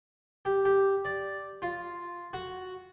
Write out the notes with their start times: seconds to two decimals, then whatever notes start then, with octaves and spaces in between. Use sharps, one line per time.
0.45 G4
0.65 G4
1.05 D5
1.62 F4
2.33 F#4